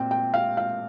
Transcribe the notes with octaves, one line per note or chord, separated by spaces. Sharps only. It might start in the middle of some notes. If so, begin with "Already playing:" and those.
Already playing: A#2 C4 G5
G5
F5
F5